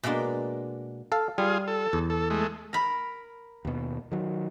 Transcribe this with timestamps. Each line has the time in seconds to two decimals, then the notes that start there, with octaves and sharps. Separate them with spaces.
0.03 B2 G#3 A#3 D4 C6
1.12 A4 F5
1.38 G3 F4 G#4
1.68 A4
1.93 E2
2.10 A4
2.30 G#3 A3
2.73 A#4 B5
3.65 D#2 B2
4.12 D#3 F#3